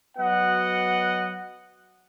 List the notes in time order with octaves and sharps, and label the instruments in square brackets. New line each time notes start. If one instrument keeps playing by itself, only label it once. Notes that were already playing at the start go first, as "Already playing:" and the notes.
[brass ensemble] F#3 B3 F#4 D#5 F#5